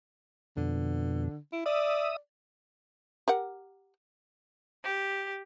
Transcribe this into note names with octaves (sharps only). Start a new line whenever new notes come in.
F2 B2 D3
E4
D5 E5 D#6
G4 A#4 F#5
G4